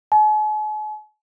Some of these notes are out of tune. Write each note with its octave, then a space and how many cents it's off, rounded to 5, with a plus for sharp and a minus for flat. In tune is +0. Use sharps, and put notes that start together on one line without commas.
G#5 +45